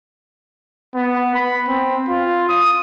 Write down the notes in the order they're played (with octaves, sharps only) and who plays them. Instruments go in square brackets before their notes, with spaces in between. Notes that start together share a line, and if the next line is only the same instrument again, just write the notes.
[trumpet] B3
B5
C4
F4
D#6